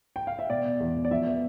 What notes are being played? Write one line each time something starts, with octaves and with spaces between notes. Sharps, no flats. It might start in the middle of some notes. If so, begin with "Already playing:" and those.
G5
F5
E5
B2 D5
B2
E2
B2
D5
F3 E5
B3